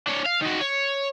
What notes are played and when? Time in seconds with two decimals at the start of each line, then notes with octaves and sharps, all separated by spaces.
0.07 D4 C#5
0.26 F5
0.41 D#3 F#4
0.60 C#5